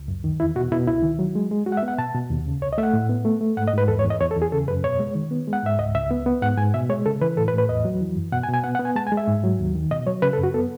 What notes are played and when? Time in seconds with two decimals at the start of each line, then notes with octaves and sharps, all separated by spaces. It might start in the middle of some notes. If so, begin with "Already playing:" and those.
Already playing: C#2
0.08 F#2
0.24 D#3
0.40 E2 E4
0.56 B2 F#4
0.71 B2 E4
0.87 C#2 E4
1.03 D#3
1.19 F#3
1.35 G#3
1.51 G#3
1.66 G#3 F#4
1.72 F#5
1.77 E5
1.83 B3
1.88 F#5
1.98 B2 A5
2.14 B2
2.30 D#2
2.46 C#3
2.62 C#2 C#5
2.73 D#5
2.78 A3 E5
2.83 F#5
2.93 A2
3.09 B3
3.25 A3
3.41 A3
3.57 G#2 F#5
3.68 D#5
3.73 G#2 B4
3.88 E2 A4
3.99 C#5
4.05 E2
4.10 D#5
4.20 E2 C#5
4.31 A4
4.36 E2
4.42 G#4
4.52 C#3 A4
4.68 F#2 B4
4.84 B2 C#5
4.99 G#3
5.15 D#3
5.31 B3
5.47 G#3
5.53 F#5
5.63 G#2 E5
5.79 C#2 D#5
5.95 C#2 E5
6.10 B3
6.26 B3
6.42 G#2 F#5
6.58 G#2 G#5
6.74 B2 E5
6.90 G#3 C#5
7.06 C#3 A4
7.21 E3 B4
7.37 A2 A4
7.48 B4
7.53 A2
7.58 B4
7.69 E2 D#5
7.85 F#3
8.01 E3
8.16 F#2
8.32 B2 F#5
8.43 G#5
8.48 B2
8.54 G#5
8.64 B3 F#5
8.75 F#5
8.79 B3
8.85 G#5
8.96 G#3 A5
9.07 G#5
9.12 G#3
9.17 E5
9.27 G#2
9.44 F#3
9.59 D#2
9.75 D#3
9.91 B2 D#5
10.07 F#3 C#5
10.22 C#3 B4
10.33 A4
10.39 F#2 F#4
10.54 B3 A4